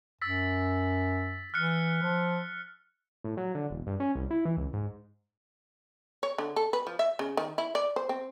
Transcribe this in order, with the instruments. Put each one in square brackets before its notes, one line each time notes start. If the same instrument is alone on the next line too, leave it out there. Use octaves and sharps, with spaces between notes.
[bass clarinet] F#2 [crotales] E6 A6 B6
[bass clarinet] E3 [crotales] F6 F#6 C#7
[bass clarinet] F3
[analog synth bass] A2
F#3
D3
E1
G2
C#4
C2
E4
E3
C#2
G#2
[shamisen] C#5
D3
A4
B4
F3
E5
C#3
D#3
E4
D5
C5
C4